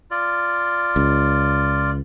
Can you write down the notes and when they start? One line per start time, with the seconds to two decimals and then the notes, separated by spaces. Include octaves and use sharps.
0.11 F4 D5
0.96 C#2